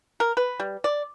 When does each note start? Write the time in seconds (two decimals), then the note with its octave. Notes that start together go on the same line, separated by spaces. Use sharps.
0.20 A#4
0.37 B4
0.60 G3
0.84 D5